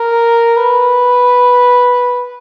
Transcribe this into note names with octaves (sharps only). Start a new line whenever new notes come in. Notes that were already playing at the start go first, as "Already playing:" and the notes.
Already playing: A#4
B4